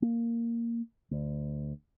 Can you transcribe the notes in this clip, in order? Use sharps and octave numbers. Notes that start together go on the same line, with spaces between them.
A#3
D2